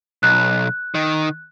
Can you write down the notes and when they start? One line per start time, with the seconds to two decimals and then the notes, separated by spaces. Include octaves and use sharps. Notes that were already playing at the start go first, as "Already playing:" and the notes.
0.23 B1 F#6
0.95 D#3